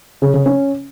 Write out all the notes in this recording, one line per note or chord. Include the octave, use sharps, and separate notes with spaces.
C#3
C#3
C#4